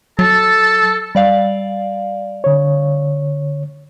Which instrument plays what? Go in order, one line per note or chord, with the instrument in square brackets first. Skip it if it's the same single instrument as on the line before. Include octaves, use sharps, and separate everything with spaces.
[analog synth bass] F#3 [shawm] A4 [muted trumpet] A5
[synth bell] G3 D5 F5
[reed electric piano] D3 C#5